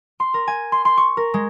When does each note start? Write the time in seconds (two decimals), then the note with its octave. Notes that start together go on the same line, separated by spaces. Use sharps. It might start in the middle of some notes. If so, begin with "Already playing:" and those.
0.20 C6
0.34 A#4
0.47 G#5
0.72 C6
0.85 C6
0.97 C#6
1.17 A#4
1.34 G#3